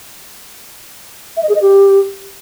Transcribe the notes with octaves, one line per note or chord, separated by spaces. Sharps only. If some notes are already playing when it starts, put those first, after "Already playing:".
E5
D#5
G#4
D#5
G4